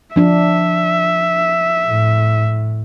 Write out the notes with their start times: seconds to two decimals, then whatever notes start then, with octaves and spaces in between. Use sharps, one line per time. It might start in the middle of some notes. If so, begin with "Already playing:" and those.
0.16 F3 D4 E5
1.86 A2